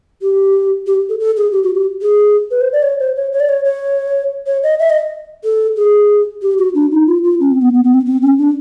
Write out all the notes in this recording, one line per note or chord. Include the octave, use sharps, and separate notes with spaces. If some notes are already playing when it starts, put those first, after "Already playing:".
G4
G4
A4
A4
G#4
G4
F#4
G4
G#4
B4
C5
D5
C#5
C5
C#5
C#5
D5
C#5
C#5
C#5
D#5
E5
D#5
A4
G#4
G4
F#4
D4
D#4
F4
F4
C#4
C4
B3
B3
B3
C4
C4
C#4
D4